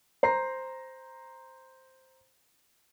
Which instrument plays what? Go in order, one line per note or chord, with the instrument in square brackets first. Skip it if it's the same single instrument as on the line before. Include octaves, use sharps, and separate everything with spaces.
[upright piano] C5 A#5 C7